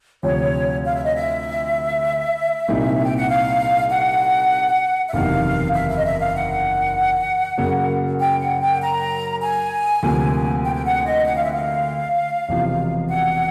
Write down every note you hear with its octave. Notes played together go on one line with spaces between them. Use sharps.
D2 C3 F3 C#5
F5
E5
D#5
E5
C2 A#2 G3 C4 D#4
G5
F#5
F5
F#5
E5
F#1 E2 C3 D#3 F5
E5
E5
D#5
E5
F5
F#5
F#2 C#3 F#3 A#3
G5
F#5
G5
A#5
G#5
D2 C3 F3 A#3
G5
G5
F#5
D#5
F#5
F5
E5
F5
E1 E2 C3 F3
F#5